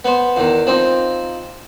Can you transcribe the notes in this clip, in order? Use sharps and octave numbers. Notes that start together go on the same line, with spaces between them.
B3 C5
E2 D#3
F3 C4 D#4